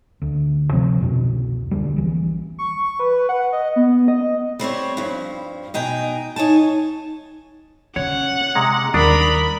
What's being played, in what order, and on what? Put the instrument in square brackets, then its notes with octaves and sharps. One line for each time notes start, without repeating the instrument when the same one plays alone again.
[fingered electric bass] D2
C3 F3 C4
C2 F2 B2
D2 G3
A#1 E3
[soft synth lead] C#6
B4
F#5
D#5
B3
D#5
[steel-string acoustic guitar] G3 C4 C5 C#5
G2 F3
B2 D#4 G5 G#5
D#4 C#5 G#5 A5
[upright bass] C#3 [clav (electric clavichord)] C#5 [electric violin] F#5
[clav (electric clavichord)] C3 G#3 [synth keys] A#5
[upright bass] D#2 G3 [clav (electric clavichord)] D4 [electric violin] A#4 B5 [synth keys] D#6